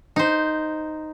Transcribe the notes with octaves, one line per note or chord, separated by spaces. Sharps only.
D#4 C5